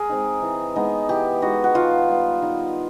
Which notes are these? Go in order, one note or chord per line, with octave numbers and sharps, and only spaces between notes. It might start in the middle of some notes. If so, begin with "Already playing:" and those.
Already playing: G#4 A#4
G#3 C4 D#4
E3
G#3 B3 D#4
E3 G4
G#3 B3 D#4 F#4
F#4
D#3 F4
G3 B3
D#3